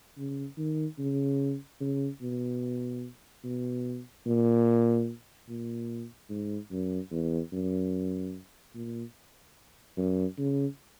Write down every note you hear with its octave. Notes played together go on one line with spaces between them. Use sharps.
C#3
D#3
C#3
C#3
B2
B2
A#2
A#2
G#2
F#2
E2
F#2
A#2
F#2
C#3